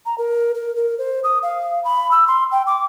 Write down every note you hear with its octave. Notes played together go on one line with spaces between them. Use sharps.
A#5
A#4
A#4
A#4
C5
D#6
F5
B5
E6
C6
G5
D6